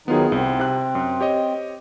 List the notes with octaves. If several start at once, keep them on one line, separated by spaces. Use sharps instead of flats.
D#3 F#3 B3 D#4 F4 G#4
C2 C4
C3 F#6
F#2
G4 C#5 D#5